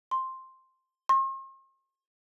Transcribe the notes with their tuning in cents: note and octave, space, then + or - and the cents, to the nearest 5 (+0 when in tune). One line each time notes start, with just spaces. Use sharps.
C6 +5
C6 +45